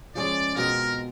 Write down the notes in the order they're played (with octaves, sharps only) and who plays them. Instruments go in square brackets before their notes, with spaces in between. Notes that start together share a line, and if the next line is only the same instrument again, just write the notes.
[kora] F3 G#3 C#4 [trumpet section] D5
[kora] B2 G#3 C4 F4 [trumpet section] A#4